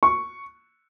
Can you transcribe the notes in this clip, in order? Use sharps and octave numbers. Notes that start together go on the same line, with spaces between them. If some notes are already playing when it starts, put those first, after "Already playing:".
C#6